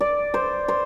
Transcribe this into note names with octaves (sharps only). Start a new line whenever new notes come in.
D5
C5
C5